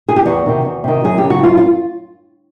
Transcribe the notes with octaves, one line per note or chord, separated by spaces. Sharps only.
G#4
G4
E2 F#4
C3 D#3
E2
C3 D#3
F#2 G#4
G4
C#3 F#3
F#4
F#2 F4
F4